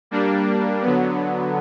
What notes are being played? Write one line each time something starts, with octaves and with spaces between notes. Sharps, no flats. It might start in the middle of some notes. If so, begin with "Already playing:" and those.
G3 A#3 D4
D3 F#3 B3